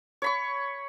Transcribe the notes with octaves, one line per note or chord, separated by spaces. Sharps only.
C#5 B5 C#6